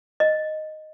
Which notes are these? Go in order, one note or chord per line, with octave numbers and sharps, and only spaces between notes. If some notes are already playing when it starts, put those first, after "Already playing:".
D#5